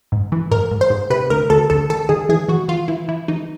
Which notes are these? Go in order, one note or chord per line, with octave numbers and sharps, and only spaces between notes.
G#2
E3
G#2 A#4
G#2
C5
G#2
C3 B4
D2 A#4
D2 A4
D2 A4
D#3 A4
D#3 G#4
E3 G#4
E3 F#4
E3 F4
E3 E4
E3 E4
E3 D#4